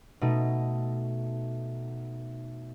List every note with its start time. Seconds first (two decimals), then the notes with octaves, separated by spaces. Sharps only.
0.21 B2 A3 D#4